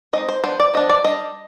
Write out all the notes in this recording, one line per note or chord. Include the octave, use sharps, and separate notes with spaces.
G#3 C4 D#4 D#5
C5
F3 B3 D4 C5
D5
F3 B3 D4 D#5
D5
G3 D4 D#5